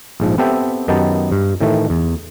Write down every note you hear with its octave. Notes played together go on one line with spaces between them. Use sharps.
A#1 G#2 F3
B3 C4 G4 A4 E5
F#2 D#3 B3 D#4 G4 A5
G2
A2 D#3 E3 A3
E2